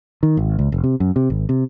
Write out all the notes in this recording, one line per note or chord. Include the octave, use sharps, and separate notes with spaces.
D#3
G#1
C#2
F1
C3
F#2
C3
G#1
C3